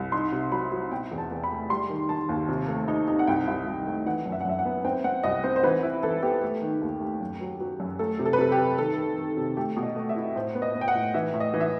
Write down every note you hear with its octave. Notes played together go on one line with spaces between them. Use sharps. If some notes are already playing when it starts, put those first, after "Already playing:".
Already playing: C2
D#4 C6
C3
F#3 B5
F#3
B2 G5
E2
A5
E2
B5
A3
G3 C6
D#3
D#3 A5
D#2
C3
A3
D#4
D#4
F#5
C2 G5
C2
C2
A3
E3 F#5
F#2
E5
F#5
F#2 E5
F#5
B3
C4 G5
C4 F#5
C2 D#5
C4 C5
C5
E3 B4
E4
E3 A4
B3 G4
A3
D#3
D#2
A3
F#2
F#3
F#3
F#2
A3 A4
C3
A4
B4
C3 A4
G4
C3
D#3 A4
D#3
D#3
C3
A3 G4
B2
D#5
A3
E5
E4
A2 C5
B3
D#5
B3
G5
F#5
A2
E3 E5
A2
D#5
E3
E5